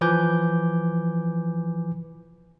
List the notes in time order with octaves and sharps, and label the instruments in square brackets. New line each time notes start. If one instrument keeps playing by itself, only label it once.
[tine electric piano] E3 F3 B4 G#5 D6 G6